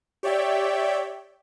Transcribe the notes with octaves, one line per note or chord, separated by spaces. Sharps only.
G4 C#5 D5 E5 G5